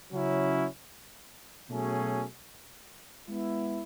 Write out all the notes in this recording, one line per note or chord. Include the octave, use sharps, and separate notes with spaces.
C#3 F#3 C#4 E4
B2 F#3 A3 C#4 G#4
G#3 B3 E4